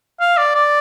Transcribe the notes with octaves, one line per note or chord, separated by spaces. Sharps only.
F5
D5
D5